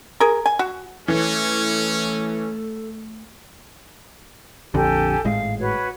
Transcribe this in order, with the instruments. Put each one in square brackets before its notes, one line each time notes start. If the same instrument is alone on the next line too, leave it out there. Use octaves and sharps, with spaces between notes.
[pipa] G#4 A#4
G#5
F#4
[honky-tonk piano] E3 [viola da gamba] A3 [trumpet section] C#4 [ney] A4
[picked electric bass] A#1 F2 D3 [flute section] G4 A4 G#5
[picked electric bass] G#1 A2 G#3 [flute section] F5
[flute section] F#4 B4 C#5